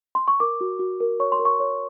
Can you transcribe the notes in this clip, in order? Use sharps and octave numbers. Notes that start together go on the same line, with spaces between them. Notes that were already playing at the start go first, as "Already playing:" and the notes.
C6
C#6
A#4 D6
F#4
F#4
A#4
C#5 C#6
C6
A#4
C#6
C#5